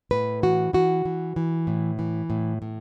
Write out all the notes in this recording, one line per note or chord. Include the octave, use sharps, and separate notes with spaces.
A2 B4
E3 F#4
E3 F#4
E3
E3
A2
E3
A2
A2